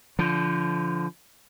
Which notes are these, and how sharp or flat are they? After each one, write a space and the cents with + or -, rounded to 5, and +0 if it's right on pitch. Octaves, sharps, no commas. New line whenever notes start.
D3 -25 F3 -15